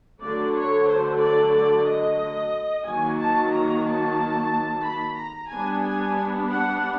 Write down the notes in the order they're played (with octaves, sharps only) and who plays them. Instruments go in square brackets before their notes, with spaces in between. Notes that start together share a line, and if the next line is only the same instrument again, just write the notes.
[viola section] D3 F#3 A3 D5
C#5
C5
D5
D5
D#5
D#3 F#3 A#3 G#5
A5
A#5
A5
B5
A#5
G3 B3 D4 G#5
G#5
F#5